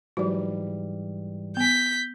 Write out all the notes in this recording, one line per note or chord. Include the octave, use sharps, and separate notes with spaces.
G#2 E3 F#3 G3 F#4
B3 G#5 G6 B6